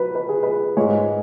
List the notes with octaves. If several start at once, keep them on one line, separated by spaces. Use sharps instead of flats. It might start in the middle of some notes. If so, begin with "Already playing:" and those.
Already playing: F#3 B4
B4
G#4
B4
G#2 G#3 C#5